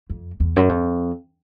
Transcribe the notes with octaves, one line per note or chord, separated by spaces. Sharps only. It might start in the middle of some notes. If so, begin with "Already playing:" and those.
F2
E2
F#2
F2